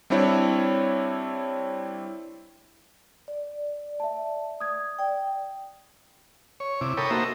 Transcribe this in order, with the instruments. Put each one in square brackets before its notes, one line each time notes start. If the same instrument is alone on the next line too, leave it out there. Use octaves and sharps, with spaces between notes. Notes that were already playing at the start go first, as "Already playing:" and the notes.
[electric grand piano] G3 C4 D4 E4 C#5
[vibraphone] D5
[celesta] E5 A5
D#6 G#6
[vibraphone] D5 G5
[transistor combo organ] C#5
C3 E4 D6
A4 A#4 C#5 G5 B5 D#6
A#3 D#4 F#4 C5 E5 A#5